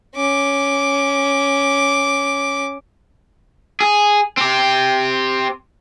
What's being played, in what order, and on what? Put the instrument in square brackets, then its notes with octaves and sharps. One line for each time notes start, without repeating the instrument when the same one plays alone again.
[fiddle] C#4 D6
[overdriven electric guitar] G#4
C4 G4